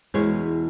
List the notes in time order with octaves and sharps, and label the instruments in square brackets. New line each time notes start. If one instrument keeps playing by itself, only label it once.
[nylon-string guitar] E2 B2 G#3 C#5